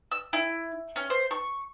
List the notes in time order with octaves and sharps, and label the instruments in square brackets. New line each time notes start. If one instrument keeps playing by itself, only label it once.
[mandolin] E6
E4
C#4
C5
C#6